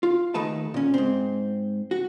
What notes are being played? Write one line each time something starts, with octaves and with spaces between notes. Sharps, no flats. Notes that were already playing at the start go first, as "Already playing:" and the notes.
F4
D#2 D#3 A3 B4 A5
A#2 C#4
G#2 C4
F#4